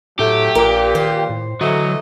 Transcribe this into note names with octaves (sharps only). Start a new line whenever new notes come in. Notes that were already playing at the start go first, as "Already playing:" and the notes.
A2 F#3 A3 G4
A#1 A#2 A#4
D#3 C5
A2
D3 E3 F#3 A3 D#5